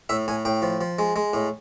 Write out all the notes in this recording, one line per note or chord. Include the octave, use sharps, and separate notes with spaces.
A2 E5
A2 G#5
A2 G5
F3
F3
G#3
G#3
A2